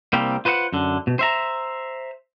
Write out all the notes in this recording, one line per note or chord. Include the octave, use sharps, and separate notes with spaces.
C2 G3 A#3 C4 G4
F4 B4 C5 D#5 F#5
F#2 D3
B2
C5 E5 A#5